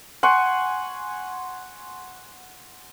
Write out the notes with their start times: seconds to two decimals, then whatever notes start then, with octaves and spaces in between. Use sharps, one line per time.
0.23 F#5 G#5 C6 C#6